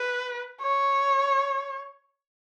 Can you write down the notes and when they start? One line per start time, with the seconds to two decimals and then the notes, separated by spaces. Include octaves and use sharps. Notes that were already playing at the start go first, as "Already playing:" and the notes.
Already playing: B4
0.62 C#5